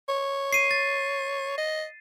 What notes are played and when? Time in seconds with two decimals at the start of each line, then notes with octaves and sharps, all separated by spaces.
0.09 C#5
0.53 C7 D#7
0.71 A6
1.58 D#5